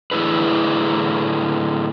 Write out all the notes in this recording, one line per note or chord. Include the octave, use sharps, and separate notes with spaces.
A2 D3 E4 G#4 B4